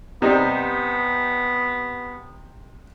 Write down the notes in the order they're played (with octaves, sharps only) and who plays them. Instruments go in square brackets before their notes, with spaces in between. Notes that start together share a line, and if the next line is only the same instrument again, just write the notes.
[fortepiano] C3 G3 D#4 [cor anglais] B3